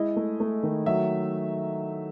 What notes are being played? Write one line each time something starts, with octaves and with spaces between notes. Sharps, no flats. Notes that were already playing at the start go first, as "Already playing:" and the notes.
Already playing: G#3 E4 D#5
A3
A3
D#3
F#3 E5